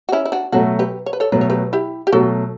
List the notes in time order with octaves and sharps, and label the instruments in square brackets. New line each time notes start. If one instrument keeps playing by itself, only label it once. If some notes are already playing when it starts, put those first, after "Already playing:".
[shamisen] F#4
C#4 E4
E4
D4 F#4
[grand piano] B2 F#3 A3 [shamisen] F#4 A4
[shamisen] G4 B4
C#5
B4
A4 C#5
[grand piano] B2 F#3 A3 [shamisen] B4
[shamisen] C#5
G4 B4
E4 G4
G4
[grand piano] B2 F#3 A3 [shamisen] F#4 A4